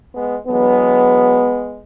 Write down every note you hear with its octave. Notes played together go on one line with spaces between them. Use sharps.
G#3 B3
E2 D3 F#3 G#3 B3